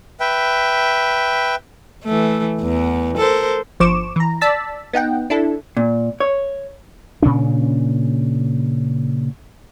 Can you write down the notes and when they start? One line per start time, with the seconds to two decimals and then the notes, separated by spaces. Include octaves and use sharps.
0.20 B4 E5 G5
2.04 E3 A3
2.61 E2
3.17 A4 A#4 C5
3.80 G1 F3 C5 C#6 D6 E7
4.16 E3 A#5
4.41 D5 A5 E6 A6 B6
4.93 B3 D#4 F#5 G5
5.30 D4 E4 A4
5.77 A#2
6.20 C#5
7.22 A#2 C#3 C#4 D4